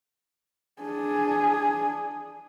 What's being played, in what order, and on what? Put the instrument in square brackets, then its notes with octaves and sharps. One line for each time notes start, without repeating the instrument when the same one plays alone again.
[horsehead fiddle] D4 G#4